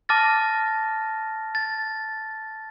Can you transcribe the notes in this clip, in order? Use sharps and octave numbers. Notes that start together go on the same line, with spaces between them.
A5 D6 F6 A6 A#6
A6